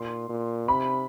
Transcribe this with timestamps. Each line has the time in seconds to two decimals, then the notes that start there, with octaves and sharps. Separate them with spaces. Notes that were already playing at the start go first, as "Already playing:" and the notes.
Already playing: A#2 C6
0.29 A#2
0.68 C3 B5